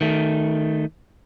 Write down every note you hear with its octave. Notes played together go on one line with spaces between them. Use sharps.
D#3 A3